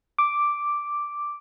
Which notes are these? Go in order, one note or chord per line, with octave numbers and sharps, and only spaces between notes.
D6